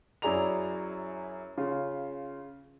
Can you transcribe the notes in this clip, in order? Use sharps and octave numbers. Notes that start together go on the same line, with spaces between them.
F#2 E4 G#4 D5 A#5 F7
C#3 F4